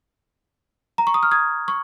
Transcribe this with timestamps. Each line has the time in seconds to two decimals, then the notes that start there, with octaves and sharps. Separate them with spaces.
0.98 A#5
1.07 C#6
1.14 D#6
1.23 F6
1.31 D#6 G#6
1.68 C#6